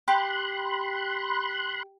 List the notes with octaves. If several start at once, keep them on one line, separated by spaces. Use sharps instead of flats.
G4 B5 C6 F#6